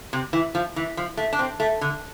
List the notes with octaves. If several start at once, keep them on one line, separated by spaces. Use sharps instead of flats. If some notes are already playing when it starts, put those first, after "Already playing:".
C3
E3
F3
E3
F3
A3
D4
C4
A3
D3